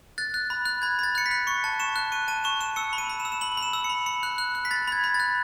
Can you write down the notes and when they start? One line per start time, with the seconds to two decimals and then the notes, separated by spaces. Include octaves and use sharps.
0.18 F#6 A6
0.34 F#6
0.50 B5
0.66 F#6
0.82 B5 G#6
0.99 B5 A6
1.15 F#6 C#7
1.26 B6
1.31 F#6
1.47 C#6 C#7
1.64 A5
1.80 C#6 E7
1.96 F#6
2.12 C#6 D#7
2.28 A5 D#7
2.44 C#6 E7
2.61 C#6 E7
2.76 E6 C#7
2.93 B5
2.98 D#7
3.10 B5
3.20 E7
3.25 E6
3.32 E7
3.41 B5 F#7
3.57 B5
3.63 E7
3.73 E6
3.84 C#7
3.90 B5
4.06 B5 C#7
4.23 F#6
4.38 F#6
4.55 F#6
4.65 B6
4.71 B5 A6
4.87 B5 G#6
5.04 B5
5.14 A6
5.20 F#6